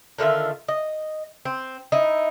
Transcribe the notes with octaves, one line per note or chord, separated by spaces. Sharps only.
D3 D#3 F4 E5
D#5
C4
D#4 E4